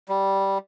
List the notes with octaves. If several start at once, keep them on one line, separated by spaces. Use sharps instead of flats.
G3